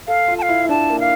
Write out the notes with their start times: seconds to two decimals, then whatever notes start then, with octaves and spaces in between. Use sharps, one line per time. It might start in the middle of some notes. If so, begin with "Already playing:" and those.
0.08 A4 F5
0.28 F4
0.38 A5
0.42 F5
0.49 E4
0.64 E4
0.69 D4 A5
0.90 A#3
1.00 F5